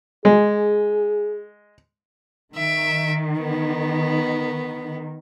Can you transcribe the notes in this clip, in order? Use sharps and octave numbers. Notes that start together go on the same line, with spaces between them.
G#3 G#4
D#3 E5 D7
B3